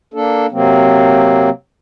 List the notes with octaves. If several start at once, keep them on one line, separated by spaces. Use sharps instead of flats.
A#3 D4 A4
C3 F#3 A#3 C4